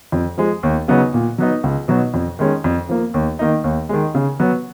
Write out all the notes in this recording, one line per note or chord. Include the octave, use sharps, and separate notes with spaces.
F2
F3 G#3
D#2
C#3 F#3 B3 D#4
A#2
F#3 B3 D#4
C#2
B2 F#3 B3 D#4
F2
D#3 G#3 C#4
F2
F3 A#3
D#2
D#3 A#3 D#4
D#2
D#3 G#3
C#3
F#3 B3